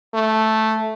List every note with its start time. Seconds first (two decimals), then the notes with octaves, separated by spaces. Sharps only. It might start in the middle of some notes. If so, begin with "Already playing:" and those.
0.14 A3